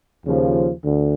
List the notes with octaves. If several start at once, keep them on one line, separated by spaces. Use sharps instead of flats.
D#2 C#3 F3
D2 D3